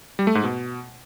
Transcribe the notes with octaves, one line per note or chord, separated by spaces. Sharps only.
G3
A3
G#2
B2